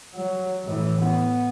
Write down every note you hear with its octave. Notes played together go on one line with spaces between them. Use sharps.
F#3
A2 E3
B3